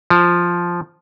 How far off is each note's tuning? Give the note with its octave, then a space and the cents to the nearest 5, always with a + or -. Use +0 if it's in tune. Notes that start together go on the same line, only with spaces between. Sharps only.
F3 +0